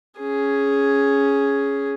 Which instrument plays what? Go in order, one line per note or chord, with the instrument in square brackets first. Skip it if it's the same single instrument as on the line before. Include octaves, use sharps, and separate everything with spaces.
[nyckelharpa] C#4 G#4